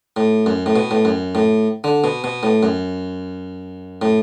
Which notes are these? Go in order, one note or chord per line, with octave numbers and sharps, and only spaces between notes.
A2
F#2
A2
B2
A2
F#2
A2
D3
B2
B2
A2
F#2
A2